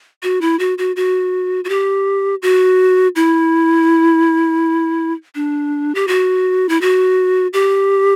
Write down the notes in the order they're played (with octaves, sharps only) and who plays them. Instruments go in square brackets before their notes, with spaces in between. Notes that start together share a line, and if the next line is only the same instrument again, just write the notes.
[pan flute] F#4
E4
F#4
F#4
F#4
F#4
G4
F#4
E4
D4
G4
F#4
E4
F#4
G4